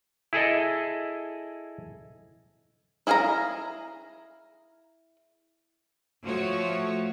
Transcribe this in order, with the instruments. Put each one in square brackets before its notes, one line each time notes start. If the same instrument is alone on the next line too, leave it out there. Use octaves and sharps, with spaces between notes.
[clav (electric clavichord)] E4 G#4 A4 D#5
[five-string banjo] E4 G#4 F5 G#5 A#5
[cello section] F3 A3 F#4 C#5